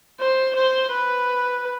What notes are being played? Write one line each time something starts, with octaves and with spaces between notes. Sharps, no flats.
C5
C5
B4